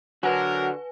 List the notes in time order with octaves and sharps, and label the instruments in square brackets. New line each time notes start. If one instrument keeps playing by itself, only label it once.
[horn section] D3 A#4 [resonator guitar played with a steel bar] F#3 [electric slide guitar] F#4 [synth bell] B4 G#5